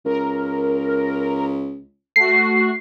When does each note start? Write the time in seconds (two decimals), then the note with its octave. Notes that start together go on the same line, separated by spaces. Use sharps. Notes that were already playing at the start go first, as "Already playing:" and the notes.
0.05 C#2 A#4
2.16 A3 F#4 C7